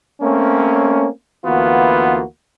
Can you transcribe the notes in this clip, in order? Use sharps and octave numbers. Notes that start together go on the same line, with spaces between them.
A3 A#3 C4 C#4
D2 E3 A#3 B3 F4 F#4